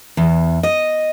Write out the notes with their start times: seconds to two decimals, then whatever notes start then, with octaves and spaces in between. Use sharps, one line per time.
0.17 E2
0.63 D#5